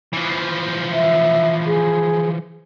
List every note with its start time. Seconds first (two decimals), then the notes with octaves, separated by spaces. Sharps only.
0.13 E3 F3
0.93 E5
1.66 G#4